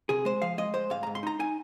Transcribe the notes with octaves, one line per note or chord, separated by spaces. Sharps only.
C3 G#4
G#3 C5
F3 F5
G#3 D#5
G#3 C5
G#2 F5
G#2 A#5
C6
D#4 A#5
D#4 G#5